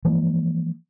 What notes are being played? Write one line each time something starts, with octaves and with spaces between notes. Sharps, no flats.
E3 F3 G#3 A#3